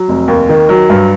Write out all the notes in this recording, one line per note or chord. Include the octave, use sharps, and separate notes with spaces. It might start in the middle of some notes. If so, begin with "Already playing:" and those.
Already playing: F#3
F1
D#2
D#3
F#3
G2